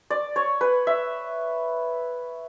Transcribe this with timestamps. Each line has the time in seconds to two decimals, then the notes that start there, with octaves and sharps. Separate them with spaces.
0.10 D5
0.36 C#5
0.61 B4
0.87 E5